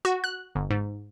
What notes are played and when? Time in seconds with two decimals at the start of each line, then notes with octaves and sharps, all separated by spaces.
0.05 F#4
0.24 F#6
0.55 G1
0.70 G#2